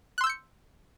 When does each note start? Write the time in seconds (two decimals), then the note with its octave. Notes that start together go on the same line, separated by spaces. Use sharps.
0.18 F#6
0.21 C6
0.24 E6
0.27 G6
0.30 C#7